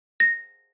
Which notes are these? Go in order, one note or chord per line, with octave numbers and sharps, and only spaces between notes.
A#6